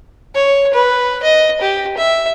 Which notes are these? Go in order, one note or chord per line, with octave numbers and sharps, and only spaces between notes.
C#5
B4
D#5
G4
E5